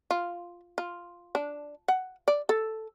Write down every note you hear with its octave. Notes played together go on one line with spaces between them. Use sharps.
F4
F4
D4
F#5
D5
A4